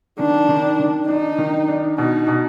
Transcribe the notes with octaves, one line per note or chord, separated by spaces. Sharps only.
D#3 D4
D#3
D#3
D4 D#4
D#3
D4
B2 D#4
B2